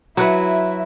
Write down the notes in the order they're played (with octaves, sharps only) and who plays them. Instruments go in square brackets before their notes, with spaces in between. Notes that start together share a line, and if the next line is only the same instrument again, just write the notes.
[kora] F#3 F#4 B4 [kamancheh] E4 E5